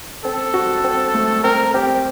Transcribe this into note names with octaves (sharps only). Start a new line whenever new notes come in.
C4 A4
F#4
C4
A3
C4 A#4
C4 G4